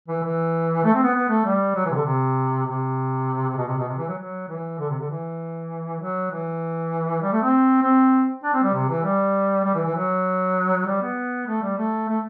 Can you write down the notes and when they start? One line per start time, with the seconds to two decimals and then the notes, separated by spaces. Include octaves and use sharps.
0.08 E3
0.23 E3
0.84 A3
0.94 C4
1.03 B3
1.15 B3
1.29 A3
1.45 G3
1.75 F#3
1.85 E3
1.91 C3
1.95 D3
2.05 C3
2.66 C3
3.57 B2
3.67 C3
3.77 B2
3.88 C3
3.98 E3
4.08 F#3
4.18 F#3
4.48 E3
4.79 D3
4.89 C3
4.99 D3
5.09 E3
6.00 F#3
6.31 E3
7.21 G3
7.32 A3
7.42 C4
7.82 C4
8.43 D4
8.53 C4
8.63 G3
8.74 C3
8.89 E3
9.04 G3
9.64 G3
9.74 E3
9.85 E3
9.95 F#3
10.86 G3
11.02 B3
11.47 A3
11.62 G3
11.78 A3
12.08 A3